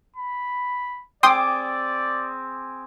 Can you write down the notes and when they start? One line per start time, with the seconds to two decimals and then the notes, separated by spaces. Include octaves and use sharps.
0.17 B5
1.23 C4 G#4 D5 G5 C6 D6 D#6